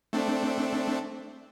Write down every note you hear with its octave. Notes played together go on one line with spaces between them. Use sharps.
A3 C4 D4